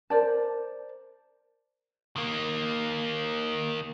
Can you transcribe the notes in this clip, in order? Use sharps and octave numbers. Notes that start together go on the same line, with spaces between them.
A#4 C5 D5 A5
D#3 A#3